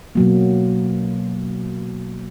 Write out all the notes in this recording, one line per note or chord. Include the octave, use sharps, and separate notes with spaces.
B2 F#3 A#3